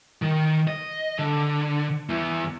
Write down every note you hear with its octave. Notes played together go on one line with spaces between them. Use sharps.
D#3
D#5
D3
E2 E3